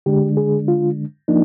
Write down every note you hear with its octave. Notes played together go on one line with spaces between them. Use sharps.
D3 G#3 D4 G4
G#4
F4
F3 A#3 D4 D#4